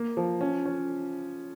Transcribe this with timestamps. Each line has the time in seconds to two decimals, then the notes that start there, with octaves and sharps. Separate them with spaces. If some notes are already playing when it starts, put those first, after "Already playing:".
Already playing: A#3
0.17 F3
0.41 C#4
0.65 C#4